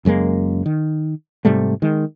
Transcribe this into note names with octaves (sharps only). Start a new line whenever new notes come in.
F#1 F#2 G#3 A#3
D#3
G#2 C3 G3 A3
D#3 G#3